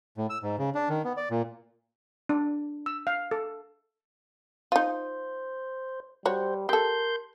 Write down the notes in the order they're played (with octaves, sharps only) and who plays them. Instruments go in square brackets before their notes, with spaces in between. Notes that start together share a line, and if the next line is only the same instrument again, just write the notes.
[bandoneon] A2
E6
G#2
C#3
D4
D#3
B3
D5
A#2
[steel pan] D4
E6
F5
A4
[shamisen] D#4 F4 [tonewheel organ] C5
[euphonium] G3 [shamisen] F#4 C#5 [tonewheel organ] C5
[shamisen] G4 A4 [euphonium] A#4 [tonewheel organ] C6 G6